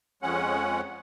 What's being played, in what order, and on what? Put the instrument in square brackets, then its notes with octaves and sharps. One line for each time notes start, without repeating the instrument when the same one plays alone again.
[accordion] F2 G#3 C#4 F#5